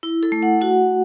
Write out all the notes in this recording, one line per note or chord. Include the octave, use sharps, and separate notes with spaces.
E4
A4
A3
F#5
F#4 F#5